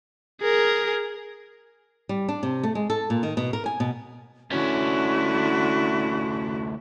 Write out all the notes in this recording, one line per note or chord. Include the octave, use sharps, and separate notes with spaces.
G#4 A#4
G3
D4
C3
A3
G#3
A4
A#2
D#3
B2
A#4
G#5
B2
D2 D3 C#4 E4 F#4